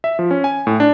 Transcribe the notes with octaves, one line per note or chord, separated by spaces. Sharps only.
E5
F3
C#4
G#5
A2
D4